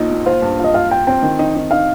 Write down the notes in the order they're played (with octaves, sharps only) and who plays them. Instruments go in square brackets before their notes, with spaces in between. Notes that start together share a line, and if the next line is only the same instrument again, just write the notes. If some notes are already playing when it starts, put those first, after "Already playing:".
Already playing: [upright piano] A#1 A#2 F3 D#4
A#2
[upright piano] F4 [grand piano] C5
[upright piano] G2
[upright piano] F4 [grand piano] D#5
[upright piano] F4 [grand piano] F5
[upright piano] F4 [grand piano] G5
[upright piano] C4 [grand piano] G5
[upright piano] D#3
D#4
D#4
[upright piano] D#4 [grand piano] F5